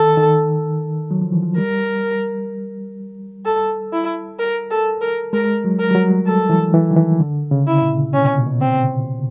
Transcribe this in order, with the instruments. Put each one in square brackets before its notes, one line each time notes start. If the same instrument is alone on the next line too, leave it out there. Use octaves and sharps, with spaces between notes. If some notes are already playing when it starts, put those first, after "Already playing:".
Already playing: [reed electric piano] D#3 [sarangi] A4
[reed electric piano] D#3
F#3
F3
E3
F3
[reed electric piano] G3 [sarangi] A#4
[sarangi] A4
E4
A#4
A4
A#4
[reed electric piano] G#3 [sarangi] A#4
[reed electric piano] F#3
[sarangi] A#4
[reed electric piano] G3
F#3
[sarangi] A4
[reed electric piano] E3
E3
D#3
E3
D3
C#3
[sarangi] E4
[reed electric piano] A#2
[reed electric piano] C3 [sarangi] C#4
[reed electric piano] B2
A#2
B2
[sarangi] C4